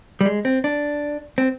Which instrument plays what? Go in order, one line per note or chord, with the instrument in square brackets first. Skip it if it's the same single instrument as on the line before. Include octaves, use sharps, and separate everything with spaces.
[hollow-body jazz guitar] G3
G#3
C4
D4
C4